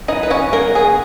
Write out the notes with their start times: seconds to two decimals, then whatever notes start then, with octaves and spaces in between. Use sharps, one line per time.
0.08 E3 D#4 D#5
0.23 B4
0.30 E3 C#4 C#5
0.52 A#3 B3 A#4
0.75 B3 G#4